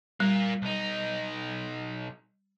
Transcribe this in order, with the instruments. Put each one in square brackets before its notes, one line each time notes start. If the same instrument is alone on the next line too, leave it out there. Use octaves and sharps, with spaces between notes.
[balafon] G3 [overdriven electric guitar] A#3 F4
[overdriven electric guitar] B1 D#4